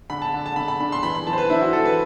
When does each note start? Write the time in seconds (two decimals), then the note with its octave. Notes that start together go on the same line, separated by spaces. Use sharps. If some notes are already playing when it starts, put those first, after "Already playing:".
0.10 D3 B5
0.22 A5
0.34 D3
0.46 A5
0.56 D3 B5
0.68 B5
0.80 D4 B5
0.92 C6
1.03 E3 B5
1.15 B5
1.27 E3 A5
1.33 C5
1.38 B4
1.50 D4 E4
1.61 F#4
1.73 E3 A4
1.86 B4